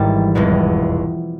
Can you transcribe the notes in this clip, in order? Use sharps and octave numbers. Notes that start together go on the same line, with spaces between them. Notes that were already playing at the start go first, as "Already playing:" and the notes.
Already playing: G#1 G#2 E3 G3 A5
F1 E2 B2 G#3